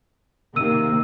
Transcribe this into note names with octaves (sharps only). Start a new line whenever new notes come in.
C3 D#3 A#3 E6 D#7